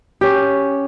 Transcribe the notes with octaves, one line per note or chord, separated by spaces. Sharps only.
C#4 G4